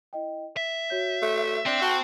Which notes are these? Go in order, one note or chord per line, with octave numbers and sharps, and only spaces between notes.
E4 D#5 G5
E5 B6
F#4 C#5 G6
A3
C4 D4 C7
F#4 F#5 A5 C#6